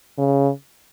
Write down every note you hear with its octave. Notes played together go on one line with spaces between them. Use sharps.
C#3